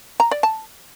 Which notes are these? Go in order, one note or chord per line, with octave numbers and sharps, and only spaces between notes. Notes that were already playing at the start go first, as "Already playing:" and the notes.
A#5
D5
A5